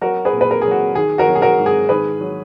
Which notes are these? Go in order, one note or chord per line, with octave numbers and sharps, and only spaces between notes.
F#3 F#4 A#4
G#4 B4
A#2
B4
A#4
F#3 G#4
F#4
D#3 G#4
F#4 A#4
F#3
G#4
F#4 A#4
G#2
G#4
D#3 G#4 B4
F#3